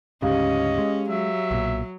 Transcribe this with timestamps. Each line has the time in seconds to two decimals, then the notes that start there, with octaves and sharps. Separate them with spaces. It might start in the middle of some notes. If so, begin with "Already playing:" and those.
0.22 D2 G#2 C#3 C#4 G4 D#5 F5
0.78 G#3
1.10 F#3 E5
1.51 B1 A#2